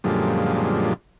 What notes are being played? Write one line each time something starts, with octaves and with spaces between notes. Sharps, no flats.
F#2 A#2 D3 F3 G3 G#3